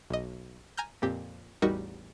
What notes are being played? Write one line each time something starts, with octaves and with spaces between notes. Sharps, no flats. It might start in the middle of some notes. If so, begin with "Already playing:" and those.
B1 D#5
G#5 A#5 F6 G6
F2 A#2 C4 G4
A1 E2 G3 D#4 F#4 A#4